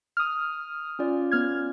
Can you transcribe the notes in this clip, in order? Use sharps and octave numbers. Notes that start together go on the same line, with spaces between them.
D#6 F6
C#4 F4 D5
B3 F6 G#6